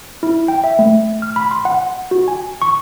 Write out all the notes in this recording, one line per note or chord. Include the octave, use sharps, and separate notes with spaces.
E4
G5
E5
A3
F6
B5
C6
F#5
F#4
G#5
C#6